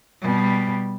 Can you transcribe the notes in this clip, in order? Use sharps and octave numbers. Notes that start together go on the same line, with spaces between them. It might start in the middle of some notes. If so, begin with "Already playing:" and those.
B2 G3